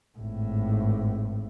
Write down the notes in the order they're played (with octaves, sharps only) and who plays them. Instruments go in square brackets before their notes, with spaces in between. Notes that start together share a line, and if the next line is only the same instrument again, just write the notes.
[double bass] G#1 A2